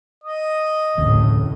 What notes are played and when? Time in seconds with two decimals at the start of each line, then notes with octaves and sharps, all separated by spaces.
0.24 D#5 D#6
0.98 F1 D2 A2 C#3